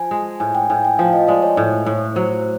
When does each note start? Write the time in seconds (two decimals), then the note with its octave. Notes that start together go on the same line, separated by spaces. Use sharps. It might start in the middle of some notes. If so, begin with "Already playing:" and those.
Already playing: F3 G#5
0.11 G#3
0.40 A2 G#5
0.55 G5
0.70 A2 G#5
0.84 G5
0.99 F3 F5
1.13 D#5
1.28 G#3 D5
1.42 C#5
1.57 A2
1.86 A2
2.16 F#3 C5